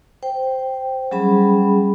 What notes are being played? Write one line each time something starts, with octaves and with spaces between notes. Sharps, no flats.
C5 G5
F#3 G3 C#4 G#4 B5